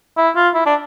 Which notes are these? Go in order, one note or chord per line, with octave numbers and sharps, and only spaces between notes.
E4
F4
E4
D4